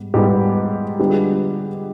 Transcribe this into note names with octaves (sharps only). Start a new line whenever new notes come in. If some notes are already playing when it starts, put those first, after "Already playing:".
Already playing: G#2 G3 B3
G#2 G3 B3 G4
D3 G3 B3 F4 G4
G#4